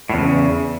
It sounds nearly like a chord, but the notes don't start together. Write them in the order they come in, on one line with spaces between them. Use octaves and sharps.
A2 E2 C#3